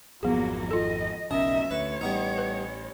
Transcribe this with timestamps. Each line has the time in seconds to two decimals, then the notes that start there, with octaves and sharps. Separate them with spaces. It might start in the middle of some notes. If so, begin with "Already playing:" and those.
0.23 G#1 F2 F3 F#3 A#3 B3 G#4
0.71 F4 A4 D#5
1.31 F#1 B1 F#2 C#4 A#4 D#5 E5
1.71 D2 B4 C#5
2.01 A1 G3 B3 D#4
2.38 B4